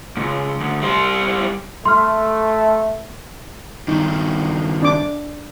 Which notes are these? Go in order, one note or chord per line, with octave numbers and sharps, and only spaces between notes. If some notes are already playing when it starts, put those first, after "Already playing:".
C#2 G#2
D2
G3 C5
A3 C6 F6
G2 D#3 D#4
D4 D6